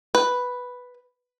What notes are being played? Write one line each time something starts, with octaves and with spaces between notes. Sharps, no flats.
B4